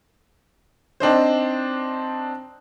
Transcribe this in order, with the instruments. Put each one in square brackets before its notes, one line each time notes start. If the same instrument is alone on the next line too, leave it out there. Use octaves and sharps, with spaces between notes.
[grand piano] C4 D4 D#4 C5